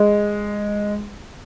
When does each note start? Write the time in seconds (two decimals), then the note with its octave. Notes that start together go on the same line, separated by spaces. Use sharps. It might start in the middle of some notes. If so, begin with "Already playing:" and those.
Already playing: G#3